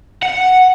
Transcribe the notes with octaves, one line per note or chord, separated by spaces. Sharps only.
F#5